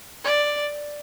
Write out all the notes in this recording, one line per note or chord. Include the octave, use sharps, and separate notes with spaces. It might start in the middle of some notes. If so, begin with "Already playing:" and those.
D5